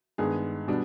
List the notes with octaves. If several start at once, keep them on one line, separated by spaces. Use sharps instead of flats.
G2 D#3 G#3 B3 G#4
B2 G3 B3 D4